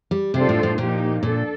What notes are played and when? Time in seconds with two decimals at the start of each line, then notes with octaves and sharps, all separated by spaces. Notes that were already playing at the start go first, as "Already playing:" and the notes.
0.11 G3
0.34 C3 G3 D4 F4 A4 C5
0.49 A2
0.63 A2
0.78 A#2 F3 A#3 D#4 G4
1.22 A#2 D4 A4